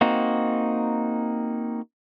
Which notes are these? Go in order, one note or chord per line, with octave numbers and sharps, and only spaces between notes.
A#3 C4 D#4 F#4